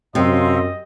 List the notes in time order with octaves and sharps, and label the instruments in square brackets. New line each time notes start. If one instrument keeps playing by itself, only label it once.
[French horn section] F#2 [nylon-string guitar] C3 [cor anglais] D#5 [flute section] F5 C6 E6